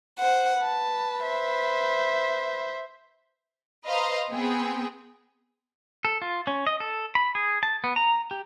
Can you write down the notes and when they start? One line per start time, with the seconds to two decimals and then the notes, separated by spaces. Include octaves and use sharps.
0.18 C5 F#5
0.62 B4 A5
1.23 C5 E5
3.86 B4 C5 D#5 F5 A#5 C6
4.30 B3 C4 G#4 G5
6.05 A4
6.22 F4
6.47 C#4
6.67 D#5
6.80 A4
7.15 B5
7.35 G#4
7.63 A5
7.84 B3
7.96 A#5
8.31 G4